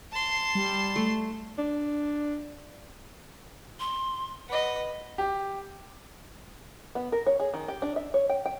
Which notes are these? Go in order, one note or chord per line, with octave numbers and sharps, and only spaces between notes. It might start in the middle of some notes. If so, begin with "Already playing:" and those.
A5 C6
G3
A3
D4
C6
B4 D#5 F#5
G4
B3
A#4
C#5
G#4
D#3
G4
D4
E5
C#5
G5
G5